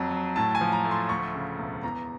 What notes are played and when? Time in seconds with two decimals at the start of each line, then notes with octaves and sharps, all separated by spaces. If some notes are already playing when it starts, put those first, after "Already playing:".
Already playing: F2 F#3 A#5
0.11 F#3
0.36 A2 A5
0.55 G#5
0.61 F3
0.72 A#5
0.85 A3
0.91 C6
1.09 D2 C#6
1.35 C#3
1.59 E1
1.83 E2 A#5